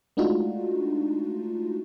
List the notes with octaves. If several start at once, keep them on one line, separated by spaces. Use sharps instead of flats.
G#3 A3 D4 D#4 F4 F#4